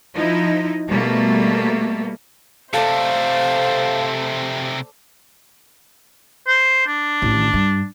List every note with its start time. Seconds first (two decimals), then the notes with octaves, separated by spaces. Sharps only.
0.14 F3 D#4 E4
0.88 B2 G3 A3 A#3
2.74 C3 A3 A4 C5 D5 F5
6.47 C5
6.87 D4
7.22 A1 D#3
7.54 G2